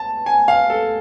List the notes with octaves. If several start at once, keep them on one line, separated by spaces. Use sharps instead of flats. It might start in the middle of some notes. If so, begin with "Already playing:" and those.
Already playing: A5
G#5
F5
A4